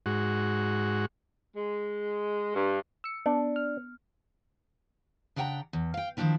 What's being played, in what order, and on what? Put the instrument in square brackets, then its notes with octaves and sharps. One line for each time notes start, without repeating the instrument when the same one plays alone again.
[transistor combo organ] G#2 F#4
[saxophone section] G#3
G2
[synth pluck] E6 C#7
[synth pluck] B3 [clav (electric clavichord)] D4
[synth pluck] F6
[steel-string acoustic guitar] C#3 D4 F#5 G5 A5 A#5
E2
F5 G5
D#3 F3 A#3 C#4 D4 E4